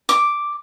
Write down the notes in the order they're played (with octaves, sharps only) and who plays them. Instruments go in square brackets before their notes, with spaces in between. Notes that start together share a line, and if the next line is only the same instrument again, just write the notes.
[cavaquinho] D6